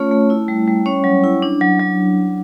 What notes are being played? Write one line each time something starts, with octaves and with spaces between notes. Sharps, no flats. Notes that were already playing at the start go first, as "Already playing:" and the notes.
Already playing: A3 C#4 F4 C#5
A3
E4
G3
G3
C#4 C#5
F#3
E4
D4
F#3
F#3